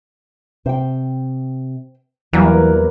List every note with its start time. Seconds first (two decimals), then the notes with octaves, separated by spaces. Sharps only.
0.66 C3 C5 G5
2.33 E2 E3 F#3 G3 A#3 A#4 B4